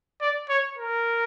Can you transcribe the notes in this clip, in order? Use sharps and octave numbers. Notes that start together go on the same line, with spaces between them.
D5
C#5
A#4